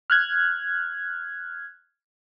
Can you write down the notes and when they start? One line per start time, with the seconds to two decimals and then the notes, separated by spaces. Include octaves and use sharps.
0.10 F6 F#6 G#6